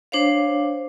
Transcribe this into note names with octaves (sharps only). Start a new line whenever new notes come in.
D4 C5 C#5 F5